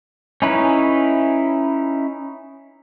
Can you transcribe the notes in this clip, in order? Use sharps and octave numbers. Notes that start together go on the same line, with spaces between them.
C#4 D#4 E4 B4